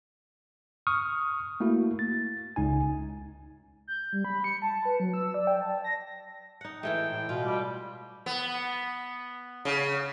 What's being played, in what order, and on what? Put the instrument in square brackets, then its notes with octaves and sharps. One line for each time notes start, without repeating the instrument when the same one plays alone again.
[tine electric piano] C#6 D#6 F6
A3 A#3 E4 F#4
A6
C#2 D#4 G#5
[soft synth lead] G6
G3
B5
C#7
A5
B4
F#3
E6
D5
G5
A5
A#6
[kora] D#4 F#5
[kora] E3 G#3 A3 [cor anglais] G5
[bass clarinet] A2
[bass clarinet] B2 [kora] F4
[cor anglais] G3
[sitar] B3
C#3